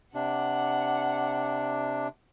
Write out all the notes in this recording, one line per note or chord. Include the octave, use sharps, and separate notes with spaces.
C3 D4 F#5